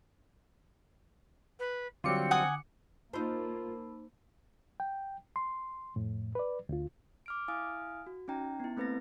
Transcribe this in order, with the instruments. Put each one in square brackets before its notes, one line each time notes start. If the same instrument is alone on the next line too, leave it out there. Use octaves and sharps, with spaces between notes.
[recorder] B4
[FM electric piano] D3 D6 C#7 [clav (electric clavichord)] F#3 G3 F4 [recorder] C4
[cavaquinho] F#5 G#5 D#6
[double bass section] A#3 [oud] D#4 C5 [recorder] F4 [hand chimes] A5 B5 E6
[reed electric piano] G5
C6
F2 A2
B4 D5
D2 F4
[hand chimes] D6 F6 D7
E4 F5 G#5 D#6 F6 D7
F#4
C#4 D#4 G5 A#5
B3 E4
A3 A#3 C4 B4 A6 A#6